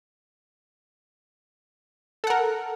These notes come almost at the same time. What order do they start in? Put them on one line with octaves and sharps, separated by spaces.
A4 F#5 A#4